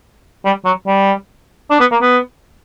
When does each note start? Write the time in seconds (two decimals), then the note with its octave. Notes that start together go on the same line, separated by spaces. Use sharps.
0.45 G3
0.65 F#3
0.87 G3
1.70 D4
1.80 B3
1.92 A#3
2.02 B3